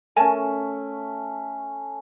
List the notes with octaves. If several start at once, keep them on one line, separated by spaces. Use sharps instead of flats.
A3 C#4 A#4 G#5 A5